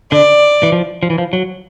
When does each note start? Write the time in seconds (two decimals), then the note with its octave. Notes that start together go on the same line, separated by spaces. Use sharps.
0.12 D3 D5
0.63 E3
0.72 F3
1.03 F3
1.10 E3
1.18 F3
1.33 F#3